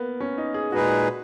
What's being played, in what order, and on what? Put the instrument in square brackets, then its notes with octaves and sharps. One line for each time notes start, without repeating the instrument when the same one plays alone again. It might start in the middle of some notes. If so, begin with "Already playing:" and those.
Already playing: [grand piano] A#3 B3
C#4
D#4
G#4
[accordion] A#2 G#3 D#4 G#4 B4 [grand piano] F#4